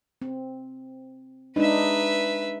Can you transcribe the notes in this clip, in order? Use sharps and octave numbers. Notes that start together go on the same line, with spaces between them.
C4
G#3 D4 D#4 B4 E5